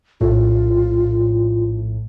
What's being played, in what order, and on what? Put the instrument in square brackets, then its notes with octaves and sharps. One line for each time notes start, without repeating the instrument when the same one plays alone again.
[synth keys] A#1 A2 [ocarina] F4